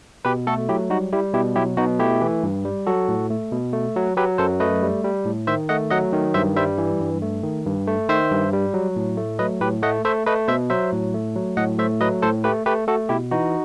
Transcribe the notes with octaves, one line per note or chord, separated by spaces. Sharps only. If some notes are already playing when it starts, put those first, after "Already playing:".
B2 G4 B4
A3 F#4 A4
F#3 E4 G4
G3 D#4 F#4
G3 E4 G4
B2 E4 G4
F#3 E4 G4
B2 D#4 F#4
A3 E4 G4
E3
G2
G3
F#3 F#4 A4
A2
A3
B2
A3
F#3
F#3 G4 B4
F#2 A4 C5
A3 B4 D#5
G3
G3
A2
D#3 C5 E5
A3 D#5 F#5
F#3 D#5 F#5
D#3
G2 C5 E5
G3 C5 E5
E3
G2
A3
D#3
G2
A3
D#3 C5 E5
G2
G3
F#3
A2
A3
F#3 B4 D#5
A2 G4 B4
A3 D#5 F#5
A3 C5 E5
A3 B4 D#5
B2 C5 E5
F#3 C5 E5
A2
A3
F#3
A2 D#5 F#5
A3 C5 E5
F#3 B4 D#5
A2 A4 C5
A3 G4 B4
A3 G4 B4
A3 F#4 A4
B2 E4 G4
E3 D#4 F#4